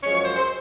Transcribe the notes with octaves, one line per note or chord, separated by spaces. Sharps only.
F#2 F3 G#3 C#5
C#5
C5
C5